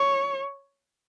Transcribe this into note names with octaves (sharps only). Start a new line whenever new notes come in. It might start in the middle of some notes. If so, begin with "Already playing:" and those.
Already playing: C#5